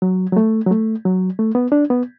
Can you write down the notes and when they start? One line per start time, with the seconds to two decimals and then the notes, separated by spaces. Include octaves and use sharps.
0.02 F#3
0.32 F#3
0.37 A3
0.66 F#3
0.71 A3
1.05 F#3
1.39 A3
1.55 B3
1.72 D4
1.90 B3